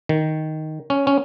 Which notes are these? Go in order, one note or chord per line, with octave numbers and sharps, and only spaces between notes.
D#3
C#4
C#4